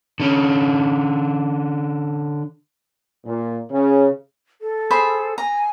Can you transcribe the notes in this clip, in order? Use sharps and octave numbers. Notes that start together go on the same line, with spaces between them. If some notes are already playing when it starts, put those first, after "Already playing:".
D3 C#4
A#2
C#3
A4
G#4 C5 B5
G#5 A#5